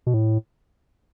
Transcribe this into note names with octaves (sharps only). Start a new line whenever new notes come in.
B2
A2